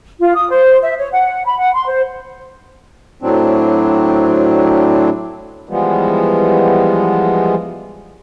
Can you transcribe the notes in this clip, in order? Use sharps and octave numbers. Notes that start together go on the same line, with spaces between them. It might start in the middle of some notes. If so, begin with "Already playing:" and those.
F4
D#6
C5
E5
C#5
F#5
B5
F#5
C6
C5
A2 F#3 C4 D4
E3 F3 G3 G#3 B3